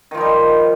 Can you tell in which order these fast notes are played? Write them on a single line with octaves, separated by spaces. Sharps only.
D#3 F3 D#4 G3